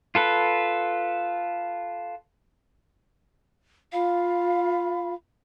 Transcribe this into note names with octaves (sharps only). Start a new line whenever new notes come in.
F4 A4 B4
F4 F5 B5